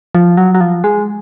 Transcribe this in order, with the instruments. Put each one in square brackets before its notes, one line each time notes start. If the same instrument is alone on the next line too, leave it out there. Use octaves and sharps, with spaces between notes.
[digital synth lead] F3
F#3
F#3
F3
G#3